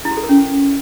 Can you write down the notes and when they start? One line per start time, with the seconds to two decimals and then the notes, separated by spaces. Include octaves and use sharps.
0.05 E4
0.11 F#4
0.17 A4
0.23 A#4
0.29 C#4